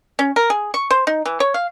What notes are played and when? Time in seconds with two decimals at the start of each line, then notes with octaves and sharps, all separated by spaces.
0.19 C#4
0.36 A#4
0.50 G#4
0.74 C#6
0.91 C5
1.07 D#4
1.26 E3
1.40 C#5
1.54 F5